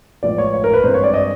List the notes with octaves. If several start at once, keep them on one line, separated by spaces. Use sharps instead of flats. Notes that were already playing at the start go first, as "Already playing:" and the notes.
A2 F3 G#3 B3 D5
C#5
C#5
A#4
B4
G2 E3 G#3 C4 C5
C#5
D5
D#5